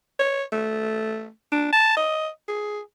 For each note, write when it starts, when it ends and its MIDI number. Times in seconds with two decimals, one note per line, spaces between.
0.19 0.44 73
0.53 1.29 57
1.52 1.68 62
1.73 1.97 81
1.97 2.28 75
2.48 2.80 68